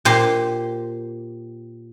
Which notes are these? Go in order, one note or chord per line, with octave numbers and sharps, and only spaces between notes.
A#2 G4 C5